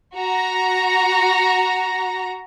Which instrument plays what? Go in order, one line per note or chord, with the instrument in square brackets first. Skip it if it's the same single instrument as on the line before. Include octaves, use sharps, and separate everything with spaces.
[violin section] F#4 A#5 A#6